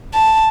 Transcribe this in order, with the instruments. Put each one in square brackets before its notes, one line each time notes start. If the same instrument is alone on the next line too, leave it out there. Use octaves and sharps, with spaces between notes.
[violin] A5